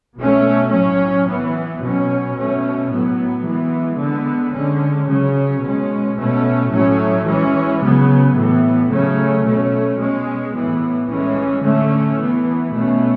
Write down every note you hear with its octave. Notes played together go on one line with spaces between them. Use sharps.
B2 A3 C#4
A2 F#3 C#4
E3 B3
B2 F#3 C#4
B2 A3 C#4
A2 F#3 B3
E3 G#3 B3
D3 G#3 B3
D3 G#3 C#4
C#3 F#3 C#4
B2 G#3 C#4
B2 A3 C#4
A2 F#3 A3 C#4
E3 G#3 C#4
C#3 F#3 B3
A2 E3 B3
C#3 F#3 A3 C#4
B2 A3 C#4
B2 G#3 C#4
A2 E3 B3
A2 E3 G#3 C#4
D3 A3 C#4
E3 B3
B2 A3 C#4